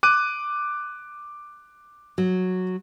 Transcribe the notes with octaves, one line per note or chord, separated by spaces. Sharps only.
D6 F#6 D#7
F#3